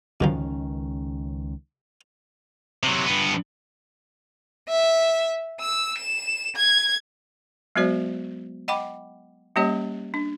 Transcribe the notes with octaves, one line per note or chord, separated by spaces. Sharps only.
C#2 F#2 D3 D#3 F3 C#4
C3 F#3
G2 B3
E5
E6
E7
G#6
F#3 G#3 B3 F#4 C5 D5
D#5 F#5 G5 B5 D6
G3 A#3 C#4 G4 C#5 D#5
D4